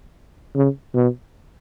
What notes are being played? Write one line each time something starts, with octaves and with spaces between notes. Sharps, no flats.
C#3
B2